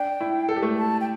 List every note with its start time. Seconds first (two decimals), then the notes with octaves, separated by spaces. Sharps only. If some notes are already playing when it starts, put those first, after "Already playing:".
Already playing: D4 G5
0.21 E4
0.49 A4
0.56 G4
0.62 A3 A4
0.77 A5
1.01 G5